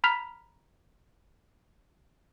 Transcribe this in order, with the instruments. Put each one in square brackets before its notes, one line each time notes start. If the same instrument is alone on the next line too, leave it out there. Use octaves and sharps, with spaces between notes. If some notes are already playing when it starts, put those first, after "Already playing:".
[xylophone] A#5 B5 F6 B6 F7